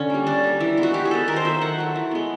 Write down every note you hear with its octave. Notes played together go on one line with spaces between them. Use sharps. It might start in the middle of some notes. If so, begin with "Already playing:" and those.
Already playing: D3 C#4
G3 A#3
D3 D4
G3 A#3
E3
G#3 B3
F#4
E3 G4
G#4
G#3 B3 A4
D#3 A#4
C5
F#3 A3 E5
D#3 F#5
F#3 A3
E3
G#3 B3